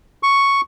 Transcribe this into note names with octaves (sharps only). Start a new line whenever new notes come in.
C#6